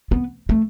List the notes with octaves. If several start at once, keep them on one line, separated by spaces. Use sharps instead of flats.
B3
A3